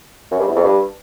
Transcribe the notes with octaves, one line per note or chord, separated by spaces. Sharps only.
F#2
G2
E2
F2
G2